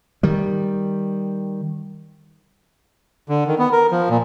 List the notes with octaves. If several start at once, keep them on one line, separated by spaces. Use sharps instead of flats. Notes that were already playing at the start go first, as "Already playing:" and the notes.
D#3 G3
D3
D#3
B3
A#4
F3
A#2